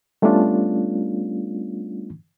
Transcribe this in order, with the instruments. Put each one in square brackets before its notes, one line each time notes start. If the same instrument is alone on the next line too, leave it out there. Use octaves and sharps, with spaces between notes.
[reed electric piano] G3 A3 B3 C#4 D4 F4